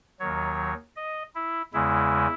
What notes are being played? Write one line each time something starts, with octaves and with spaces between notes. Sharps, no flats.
D#2 D#3 F#3 C#5
D#5
E4
E2 C#3 G#3 E4